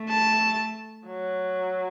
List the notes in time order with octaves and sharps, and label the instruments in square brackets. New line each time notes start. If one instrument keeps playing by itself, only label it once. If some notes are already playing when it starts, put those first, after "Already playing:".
Already playing: [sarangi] A3
[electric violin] A5
[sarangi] F#3